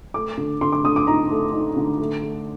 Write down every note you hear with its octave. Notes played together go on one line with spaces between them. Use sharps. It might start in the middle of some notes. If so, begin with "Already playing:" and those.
A3 D6
D3
D3 C6
D6
D3 D#6
D6
D#4 A#5
A3
D#4
D3
A3
A3